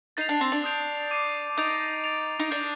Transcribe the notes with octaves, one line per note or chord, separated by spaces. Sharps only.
D#4 A6 C7 F7
D4
C4
D4
D#6 G6 D7 F7
D6 G6 C7 D#7
D#4 D#6 A6 D7 F7
A6 D7 F7
D#4
D4 G6 D7 F7